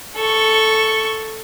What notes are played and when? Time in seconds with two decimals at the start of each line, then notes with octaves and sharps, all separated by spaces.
0.16 A4 C#6